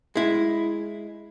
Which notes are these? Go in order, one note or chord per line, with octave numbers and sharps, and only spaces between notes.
G#3 E4